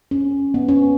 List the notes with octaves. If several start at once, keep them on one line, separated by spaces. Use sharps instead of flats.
C#4
B3
C#4